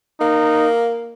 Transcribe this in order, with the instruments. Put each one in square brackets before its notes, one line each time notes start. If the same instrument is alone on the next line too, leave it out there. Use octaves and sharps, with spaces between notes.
[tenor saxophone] A#3 [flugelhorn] D#4